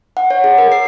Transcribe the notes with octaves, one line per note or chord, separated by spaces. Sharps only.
F#5
C#5
G#4
A#4
C7